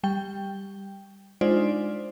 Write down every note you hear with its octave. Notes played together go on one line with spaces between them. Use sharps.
G3 G5
G#3 D4 D#4 F4 C5 D5